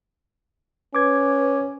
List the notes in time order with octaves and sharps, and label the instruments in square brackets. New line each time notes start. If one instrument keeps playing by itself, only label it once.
[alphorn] C#4 [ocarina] B4 [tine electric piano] D6 G#6